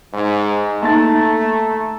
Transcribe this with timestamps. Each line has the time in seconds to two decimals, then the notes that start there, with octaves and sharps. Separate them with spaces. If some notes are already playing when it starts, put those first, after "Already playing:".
0.14 G#2
0.83 A3 A#3 D#4 A5 A#5 A6